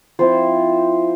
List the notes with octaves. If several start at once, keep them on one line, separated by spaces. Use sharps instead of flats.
F3 C4 E4 C5